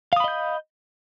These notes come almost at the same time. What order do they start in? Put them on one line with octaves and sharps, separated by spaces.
F5 D#6 B5 D#5 G6